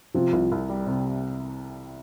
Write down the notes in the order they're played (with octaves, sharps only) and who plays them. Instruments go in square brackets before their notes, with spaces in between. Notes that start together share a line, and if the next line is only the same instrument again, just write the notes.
[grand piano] C3 [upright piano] F3
[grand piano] C2
C2
G3
C3